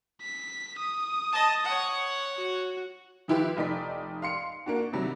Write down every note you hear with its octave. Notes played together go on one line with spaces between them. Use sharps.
B6
D#6
D#5 A5
C#5 F#5
F#4
D#3 F3 E4 F4 G4 B4
F1 D#4 D5 B6
F5 C6 C#7
A#3 D4 F#4
C3 D#3 F#3 G3